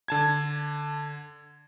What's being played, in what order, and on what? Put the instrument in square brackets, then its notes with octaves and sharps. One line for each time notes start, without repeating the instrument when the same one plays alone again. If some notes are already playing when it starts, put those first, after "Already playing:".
[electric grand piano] D3 A5 G#6